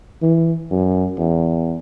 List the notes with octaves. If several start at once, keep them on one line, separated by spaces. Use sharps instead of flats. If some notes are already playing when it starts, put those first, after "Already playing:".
E3
F#2
E2